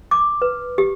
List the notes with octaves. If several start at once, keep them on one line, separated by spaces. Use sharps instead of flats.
D6
B4
G4